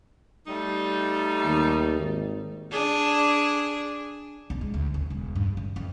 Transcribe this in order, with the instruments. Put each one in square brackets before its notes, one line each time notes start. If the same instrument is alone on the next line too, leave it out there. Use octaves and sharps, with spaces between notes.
[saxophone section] G3 A3 D#4
[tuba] D#2
G#1
[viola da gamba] D4 G#4
[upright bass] B1
G#3
D2
C2
E1
G2
G3
F2